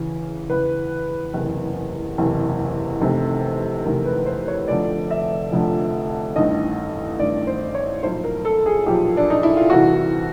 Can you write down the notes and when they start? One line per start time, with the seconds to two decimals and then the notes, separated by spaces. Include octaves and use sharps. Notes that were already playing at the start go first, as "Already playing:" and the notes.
Already playing: E2 C#3 E3
0.50 E2 C#3 E3 B4
1.34 F#1 E2 C3
2.18 F#1 E2 C3
3.01 F1 E2 C3 D#3
3.85 F1 E2 C3 D#3 A#4
4.06 B4
4.26 C5
4.48 C#5
4.68 F1 F2 D3 F3 D5
5.11 E5
5.52 F1 F2 D3 F3
6.36 A1 G2 D#3 D#5
7.19 A1 G2 D#3 D5
7.47 C5
7.75 C#5
8.03 B1 A#2 F3 C5
8.24 A#4
8.45 A4
8.66 G#4
8.86 B1 A#2 F3 G4
9.17 D4
9.30 D#4
9.43 E4
9.56 F4
9.70 C2 C3 E3 F#4